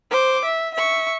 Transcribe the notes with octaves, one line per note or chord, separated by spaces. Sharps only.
C5 D6
E5
E5 C#6